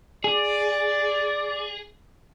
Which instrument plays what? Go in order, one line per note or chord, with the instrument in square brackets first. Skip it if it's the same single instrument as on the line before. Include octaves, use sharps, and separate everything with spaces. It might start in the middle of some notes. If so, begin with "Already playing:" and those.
[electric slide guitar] G#4 [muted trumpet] D5